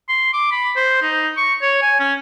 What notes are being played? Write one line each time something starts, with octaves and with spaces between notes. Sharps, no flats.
C6
D6
B5
C5
D#4
C#6
C#5
G#5
C#4